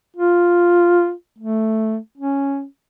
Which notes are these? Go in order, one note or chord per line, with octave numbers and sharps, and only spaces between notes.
F4
A3
C#4